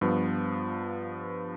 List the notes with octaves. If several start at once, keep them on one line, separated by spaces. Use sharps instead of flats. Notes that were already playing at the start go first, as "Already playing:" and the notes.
G2 F3 B3